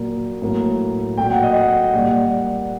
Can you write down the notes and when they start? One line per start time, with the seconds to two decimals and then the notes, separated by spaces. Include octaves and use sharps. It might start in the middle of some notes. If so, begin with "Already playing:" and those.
Already playing: A#2 F#3 A#3
0.42 A2 F#3 A#3
1.17 A#2 F#3 A3 G5
1.31 F#5
1.43 D#5
1.56 F#5
1.93 A#2 G3 A#3